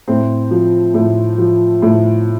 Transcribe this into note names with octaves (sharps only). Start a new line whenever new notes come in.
A2 C4
F3
A2
F3
A2